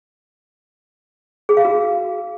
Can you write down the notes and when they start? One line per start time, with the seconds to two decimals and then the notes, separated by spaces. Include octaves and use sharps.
1.49 G#4
1.57 F5
1.65 F#4